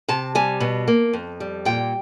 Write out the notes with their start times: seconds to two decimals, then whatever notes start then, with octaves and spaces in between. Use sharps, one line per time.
0.08 C3 A5
0.35 G3 G#5
0.60 B2
0.88 A#3
1.13 F2
1.40 G3
1.65 A#2 G5